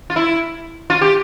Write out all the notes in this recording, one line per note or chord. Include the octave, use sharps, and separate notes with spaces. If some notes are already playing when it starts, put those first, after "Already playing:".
F4
E4
F4
G4